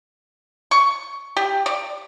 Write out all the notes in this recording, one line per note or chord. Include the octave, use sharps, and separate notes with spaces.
C#6
G4
D5